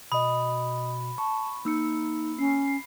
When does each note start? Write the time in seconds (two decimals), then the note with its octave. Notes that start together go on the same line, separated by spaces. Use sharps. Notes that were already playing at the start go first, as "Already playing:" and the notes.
0.12 B2 D#5 B5 D#6
1.18 A5 C#6
1.65 A#3 D#4 E6 C#7
2.39 C#4 C7